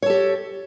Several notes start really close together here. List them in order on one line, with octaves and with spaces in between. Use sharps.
C#5 A4 G4